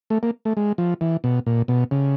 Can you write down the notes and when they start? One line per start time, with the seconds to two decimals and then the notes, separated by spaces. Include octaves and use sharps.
0.10 A3
0.23 A#3
0.45 A3
0.57 G#3
0.78 F3
1.01 E3
1.24 B2
1.46 A#2
1.68 B2
1.91 C#3